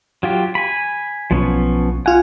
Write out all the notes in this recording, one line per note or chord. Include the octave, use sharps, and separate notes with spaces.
F#3 F4 G4
G#5 B5
B1 F3 B3 C#4
F4 F#5 G#5 F6